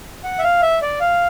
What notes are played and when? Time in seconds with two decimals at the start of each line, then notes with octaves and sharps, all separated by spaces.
0.24 F#5
0.39 E5
0.44 F5
0.62 E5
0.82 D5
1.00 F5